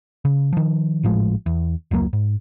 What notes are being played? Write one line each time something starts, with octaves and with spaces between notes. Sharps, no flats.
C#3
D#3 F3
G#1 A2 F3 G#3
E2
F1 C#2 F#3 A#3
G#2